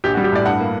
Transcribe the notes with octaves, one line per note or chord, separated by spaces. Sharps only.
A#1 G4
F#4
G3
G4
A2 D5
G2 F#5
A#3